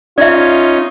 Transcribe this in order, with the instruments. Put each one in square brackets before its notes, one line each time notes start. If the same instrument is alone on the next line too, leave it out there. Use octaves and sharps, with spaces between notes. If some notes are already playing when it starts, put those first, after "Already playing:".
[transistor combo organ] C#4 D#4 [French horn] F4 [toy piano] D5 E5